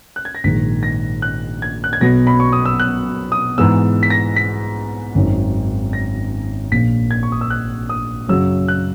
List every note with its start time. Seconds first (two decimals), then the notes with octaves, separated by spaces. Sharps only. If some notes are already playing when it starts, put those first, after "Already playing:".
0.16 F#6
0.25 G#6
0.35 A#6
0.44 A#1 G#2 D#3 B6
0.83 A#6
1.22 F#6
1.62 G#6
1.84 F#6
1.93 G#6
2.01 B1 B2 F#3 B3 A#6
2.27 B5
2.40 C#6
2.53 D#6
2.66 E6
2.80 F#6
3.32 D#6
3.58 G#2 E3 G#3 B3 E6
4.03 B6
4.10 A#6
4.36 B6
5.15 G#1 F#2 D#3
5.93 A#6
6.72 A#1 A#2 A#3 B6
7.11 G#6
7.23 C#6
7.32 D#6
7.41 E6
7.50 F#6
7.89 D#6
8.29 F#2 C#3 F#3 E6
8.68 F#6